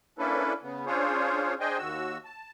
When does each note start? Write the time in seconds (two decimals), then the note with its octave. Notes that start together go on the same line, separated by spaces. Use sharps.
0.19 A#3 C#4 D4 E4 A4 B4
0.63 C#3 B3
0.86 C#4 D4 F4 G#4 C5 C#5
1.60 D4 G#4 C5 D#5 G5 G#5
1.78 D#2 F#4 E6
2.25 A5